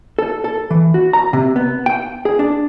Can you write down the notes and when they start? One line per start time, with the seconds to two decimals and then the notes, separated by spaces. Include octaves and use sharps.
0.19 A4
0.44 A4
0.71 E3
0.94 F#4
1.13 A#5
1.33 C3
1.56 B3
1.86 G5
2.25 G#4
2.39 D4